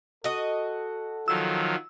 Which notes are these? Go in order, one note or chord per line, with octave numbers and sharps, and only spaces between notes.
F#4 A4 D#5
D#3 F3 F#3 E6